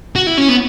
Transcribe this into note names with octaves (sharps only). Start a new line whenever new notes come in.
F#4
E4
C#4
B3